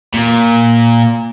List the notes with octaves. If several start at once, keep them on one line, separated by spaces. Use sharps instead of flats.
A#2